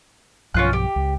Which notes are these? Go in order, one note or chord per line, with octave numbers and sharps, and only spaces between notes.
B1 G2 F3 C#4 F4 F#6
G4
C#2